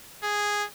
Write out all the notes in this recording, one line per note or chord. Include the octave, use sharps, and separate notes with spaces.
G#4